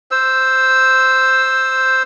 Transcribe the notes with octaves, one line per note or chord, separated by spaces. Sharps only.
C5 E6